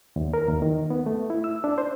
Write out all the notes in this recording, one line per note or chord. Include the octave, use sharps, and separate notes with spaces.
D#2
A#4
D#2
D#3
B3
A3
E4
E6
D4
C5